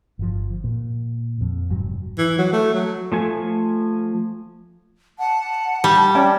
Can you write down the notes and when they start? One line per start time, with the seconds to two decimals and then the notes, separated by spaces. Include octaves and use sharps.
0.19 G1 F3
0.64 A#2
1.41 F2
1.70 F1 G#2 F#3
2.18 E3
2.38 F#3
2.53 A3
2.74 F#3
3.12 F3 A3 G#5
5.19 F#5 A5
5.84 G3
6.15 C#4 D5 G5 A5